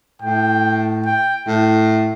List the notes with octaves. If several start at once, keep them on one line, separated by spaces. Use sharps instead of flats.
A2 G5
G5
A2